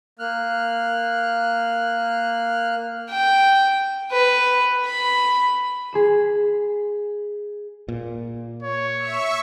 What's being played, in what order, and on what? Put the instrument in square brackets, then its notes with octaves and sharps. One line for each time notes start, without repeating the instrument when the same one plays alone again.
[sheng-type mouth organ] A#3 F6 F#6
[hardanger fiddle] G5
B4
B5
[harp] G#4 C6 E7
[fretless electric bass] A#2
[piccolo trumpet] C#5
[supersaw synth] E5 C#6